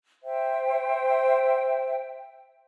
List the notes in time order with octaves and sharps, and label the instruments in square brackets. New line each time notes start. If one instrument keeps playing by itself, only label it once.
[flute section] C5 E5 G5